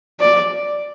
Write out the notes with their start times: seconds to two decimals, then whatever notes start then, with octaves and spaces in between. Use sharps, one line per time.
0.20 D5